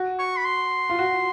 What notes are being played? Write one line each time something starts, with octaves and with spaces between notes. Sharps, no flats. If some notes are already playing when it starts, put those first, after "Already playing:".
Already playing: F#4
C#6
B5
C6
F4
F#4